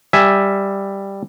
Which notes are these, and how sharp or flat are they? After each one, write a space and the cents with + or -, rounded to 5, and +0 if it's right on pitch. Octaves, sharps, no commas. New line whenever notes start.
G3 +5 E5 +0 G#5 +0